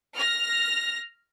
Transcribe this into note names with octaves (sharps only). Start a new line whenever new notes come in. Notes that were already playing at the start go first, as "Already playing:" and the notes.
F6 A#6